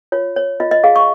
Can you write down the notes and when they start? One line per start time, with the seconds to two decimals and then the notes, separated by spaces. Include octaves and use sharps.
0.12 F4 C#5
0.36 C#5
0.60 F4 D#5
0.71 D#5
0.84 G#4 F5
0.96 C#6